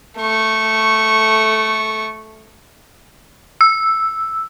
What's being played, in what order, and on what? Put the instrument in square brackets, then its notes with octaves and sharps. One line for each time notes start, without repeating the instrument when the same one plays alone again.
[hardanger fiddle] A3 C#6
[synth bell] E6